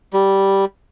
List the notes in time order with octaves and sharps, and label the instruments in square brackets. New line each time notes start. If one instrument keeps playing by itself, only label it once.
[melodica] G3